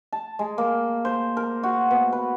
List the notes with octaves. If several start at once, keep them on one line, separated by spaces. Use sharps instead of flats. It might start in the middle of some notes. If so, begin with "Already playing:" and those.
A5
G#3
A#3
C5
A#4
F#4
B2
B4